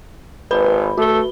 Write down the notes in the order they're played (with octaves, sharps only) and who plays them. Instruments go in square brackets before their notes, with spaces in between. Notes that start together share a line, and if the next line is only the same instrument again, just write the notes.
[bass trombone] G#1 [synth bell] B4 B5
[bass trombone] A3 [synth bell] F#4 G7